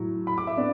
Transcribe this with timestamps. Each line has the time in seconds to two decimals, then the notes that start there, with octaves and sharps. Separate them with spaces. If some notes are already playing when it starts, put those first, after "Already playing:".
Already playing: A2 F#3
0.27 B5
0.38 D6
0.47 E5
0.57 B3 D4 D5